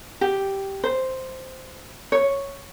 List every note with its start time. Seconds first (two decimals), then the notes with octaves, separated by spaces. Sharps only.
0.21 G4
0.84 C5
2.12 C#5